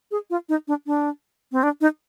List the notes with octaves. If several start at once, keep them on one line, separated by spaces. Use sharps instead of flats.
G#4
F4
D#4
D4
D4
C4
D4
D#4